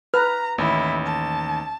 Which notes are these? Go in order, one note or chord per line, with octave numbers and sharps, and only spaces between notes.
B4 A#5 F6
A1 D#2 E4
A5